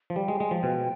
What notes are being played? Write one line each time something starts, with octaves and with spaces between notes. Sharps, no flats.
F3
G3 G5
G#3
G#3
F3
B2